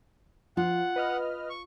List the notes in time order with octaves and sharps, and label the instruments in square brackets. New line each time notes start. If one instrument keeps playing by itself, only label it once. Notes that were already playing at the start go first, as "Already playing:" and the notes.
[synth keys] F3 [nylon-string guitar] F4 [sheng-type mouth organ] F#5
[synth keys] B4 D#5 F6
[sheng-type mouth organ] C#6